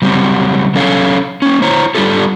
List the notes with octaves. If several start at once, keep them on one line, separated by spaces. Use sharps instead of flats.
C#3 F#3 G3 C4 F#4
F#3 C#4 A4 C#5 F5
A#3 C#4
E4 C5 C#5 A#5
G3 D4 F4 G4 A4